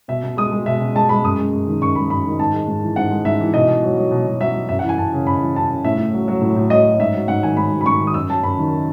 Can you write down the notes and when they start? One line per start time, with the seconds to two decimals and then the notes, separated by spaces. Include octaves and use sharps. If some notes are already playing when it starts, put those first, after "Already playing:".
0.08 B2 E5
0.23 B2
0.37 G#3 D#6
0.52 G#3
0.66 B2 E5
0.81 B2
0.95 G#3 A5
1.09 G#3 B5
1.23 F#2 D#6
1.38 G#3
1.53 F#2
1.67 D#3
1.81 F#2 C#6
1.95 G#3 B5
2.10 F#2 B5
2.25 D#3
2.39 G#2 A5
2.54 G#3
2.68 G#2
2.82 E3
2.96 G#2 F#5
3.11 G#3
3.25 G#2 E5
3.40 E3
3.54 B2 D#5
3.68 B2
3.83 F#3
3.97 F#3
4.11 B2
4.27 B2
4.41 F#3 E5
4.54 F#3
4.69 F#2 E5
4.79 F#5
4.83 E3
4.89 G#5
4.98 F#2 A5
5.12 C#3
5.26 F#2 B5
5.42 E3
5.55 F#2 A5
5.70 C#3
5.85 A2 E5
5.98 A2
6.14 F#3
6.28 F#3
6.41 A2
6.56 A2
6.70 F#3 D#5
6.85 F#3
6.99 G#2 E5
7.14 F#3
7.28 G#2 F#5
7.43 D#3 G#5
7.57 G#2 B5
7.72 F#3
7.81 B5
7.86 G#2 C#6
8.00 D#3
8.07 D#6
8.14 F#2 E6
8.29 F#3 A5
8.43 F#2 B5
8.58 D#3